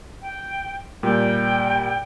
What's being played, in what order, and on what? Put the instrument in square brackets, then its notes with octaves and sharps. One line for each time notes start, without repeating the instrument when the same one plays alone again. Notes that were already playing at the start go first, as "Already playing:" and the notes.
[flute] G5
[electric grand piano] A#2 G3 [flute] G5